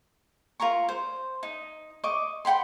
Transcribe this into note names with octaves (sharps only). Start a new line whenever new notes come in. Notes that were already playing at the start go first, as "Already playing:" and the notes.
F4 A#4 A#5 C#6
C5
D#4
D#5 C#6 D6
F#5 G5 B5 C6